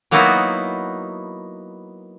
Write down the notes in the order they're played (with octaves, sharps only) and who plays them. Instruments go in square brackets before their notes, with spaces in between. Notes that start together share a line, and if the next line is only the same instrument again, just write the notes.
[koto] F#3 A#3 B3 D#4 E4 F#4